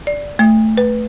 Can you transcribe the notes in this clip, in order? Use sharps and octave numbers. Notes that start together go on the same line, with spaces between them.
D5
A3
B4